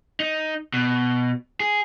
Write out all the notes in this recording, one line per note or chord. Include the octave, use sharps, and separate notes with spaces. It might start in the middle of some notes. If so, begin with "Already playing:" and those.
D#4
B2
G#4